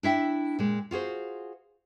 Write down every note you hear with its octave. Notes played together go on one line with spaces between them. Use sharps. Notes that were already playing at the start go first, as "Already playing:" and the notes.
D4 E4 E5 G5
A#2 G#3
F4 F#4 G#4 C5